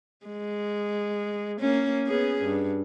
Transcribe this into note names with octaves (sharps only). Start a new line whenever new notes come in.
G#3
A#3 C#4
B3 C#4 G#4
G2